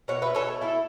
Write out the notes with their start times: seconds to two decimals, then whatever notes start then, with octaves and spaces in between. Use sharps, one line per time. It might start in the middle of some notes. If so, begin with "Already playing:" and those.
0.08 B2 C#5 F#5
0.22 B2 B4 E5
0.35 A4 C#5
0.44 A3
0.61 A3 E4 A4